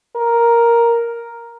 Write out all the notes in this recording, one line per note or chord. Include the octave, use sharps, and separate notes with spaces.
A#4